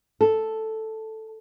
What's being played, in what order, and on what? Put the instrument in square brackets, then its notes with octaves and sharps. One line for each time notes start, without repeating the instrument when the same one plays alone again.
[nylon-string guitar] A4